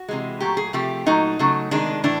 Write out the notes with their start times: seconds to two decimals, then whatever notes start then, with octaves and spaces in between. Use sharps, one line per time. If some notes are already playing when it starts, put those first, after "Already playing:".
Already playing: F#4
0.09 C3 E3 G#3
0.40 A#2 F#3 A3 G4
0.57 G#4
0.73 C3 F3 A3 G4
1.07 A#2 F#3 A3 D#4
1.39 C#3 F#3 A3
1.71 C3 D#3 G#3 D4
2.04 A2 E3 D4